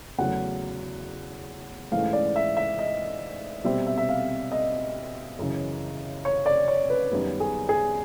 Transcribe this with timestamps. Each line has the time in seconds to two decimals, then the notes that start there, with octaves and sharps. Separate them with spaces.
0.18 E2 C#3 F#3 A3 F#5
1.92 G#2 E3 A3 C#4 F5
2.13 D5
2.36 E5
2.57 E5
2.79 D#5
3.64 B2 G3 C4 E5
3.87 E5
3.97 E5
4.09 F5
4.52 D#5
5.39 F#2 C#3 E3
6.25 C#5
6.46 D5
6.68 C#5
6.90 B4
7.11 F#2 D#3 G3 B3
7.40 G#4
7.69 G#4